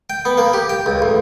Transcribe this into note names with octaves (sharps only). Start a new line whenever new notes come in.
G5
B3
A#3
G4
G5
C#2
A1